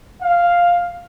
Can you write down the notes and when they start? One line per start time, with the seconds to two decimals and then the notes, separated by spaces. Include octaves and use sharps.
0.22 F5